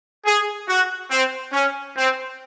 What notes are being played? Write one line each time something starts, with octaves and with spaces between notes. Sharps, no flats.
G#4
F#4
C4
C#4
C4